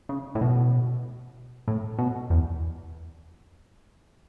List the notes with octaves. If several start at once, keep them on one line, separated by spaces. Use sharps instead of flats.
C#3
A2
B2
A2
B2
E2